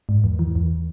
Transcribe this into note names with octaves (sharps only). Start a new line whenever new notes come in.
G#2
E2
E3
E2